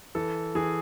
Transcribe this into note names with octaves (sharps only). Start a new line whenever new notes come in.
E3 A4
E3 G#4